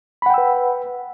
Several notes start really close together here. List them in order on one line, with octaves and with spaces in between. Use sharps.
B5 F#5 G5 E6 B4